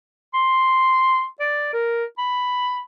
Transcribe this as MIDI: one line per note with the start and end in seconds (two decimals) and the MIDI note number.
0.34 1.25 84
1.40 1.72 74
1.73 2.04 70
2.18 2.81 83